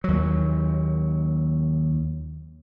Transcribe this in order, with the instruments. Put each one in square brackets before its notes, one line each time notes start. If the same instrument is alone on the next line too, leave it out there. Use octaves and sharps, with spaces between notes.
[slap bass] D#2 F#3